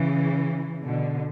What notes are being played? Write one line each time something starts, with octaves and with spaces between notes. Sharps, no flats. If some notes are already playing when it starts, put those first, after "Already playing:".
Already playing: C#3 E3
B2 D3